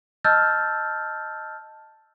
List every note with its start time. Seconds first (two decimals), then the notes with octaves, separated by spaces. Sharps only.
0.24 D#5 A5 E6 F6 G6 A6